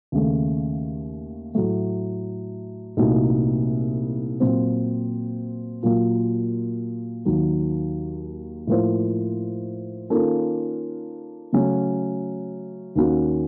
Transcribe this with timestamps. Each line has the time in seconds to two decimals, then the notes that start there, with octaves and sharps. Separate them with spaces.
0.12 D#2 C#3 A3
1.55 A2 F#3 A3
2.97 C2 A#2 A3 D#4 F#4
4.40 A#2 F#3 C4
5.83 A#2 F#3 A#3 F4
7.25 D#2 D#3 F#3
8.67 A2 F3 A#3 F4 C5
10.10 D#3 A#3 C#4 F4 A4
11.53 C#3 F#3 A3 C#4
12.95 D#2 D#3 A#3 C#4 F#4